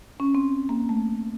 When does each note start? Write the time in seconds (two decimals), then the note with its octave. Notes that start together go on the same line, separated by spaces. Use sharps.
0.20 C#4
0.35 C4
0.69 A#3
0.89 A3